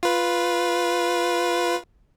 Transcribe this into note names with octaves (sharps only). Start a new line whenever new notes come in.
F4 B4